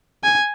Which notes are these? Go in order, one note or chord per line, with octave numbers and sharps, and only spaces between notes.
G#5